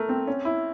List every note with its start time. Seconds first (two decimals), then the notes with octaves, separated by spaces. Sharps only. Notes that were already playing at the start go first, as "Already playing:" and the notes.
Already playing: A3 A#4
0.09 C4
0.27 C#4
0.45 E4